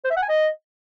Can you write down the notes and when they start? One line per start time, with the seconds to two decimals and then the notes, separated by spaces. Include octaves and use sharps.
0.04 C5
0.10 E5
0.16 F#5
0.23 G#5
0.29 D#5